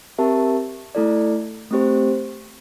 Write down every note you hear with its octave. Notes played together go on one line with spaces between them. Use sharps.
C4 G4 A#4 E5 A5
A3 E4 A4 D5
A3 C4 G4 C5